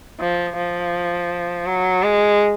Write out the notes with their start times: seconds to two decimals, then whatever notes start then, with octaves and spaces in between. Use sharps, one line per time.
0.20 F3
0.57 F3
1.66 F#3
2.03 G#3